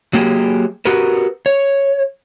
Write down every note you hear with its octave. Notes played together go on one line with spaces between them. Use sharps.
F#3 A#3 G4 G#4
F#4 G4 A#4 B4
C#5